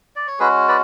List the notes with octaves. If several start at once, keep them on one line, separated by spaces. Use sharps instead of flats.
D5
C#5
G#3 C#4 F#4 G#4 B4
B4 D5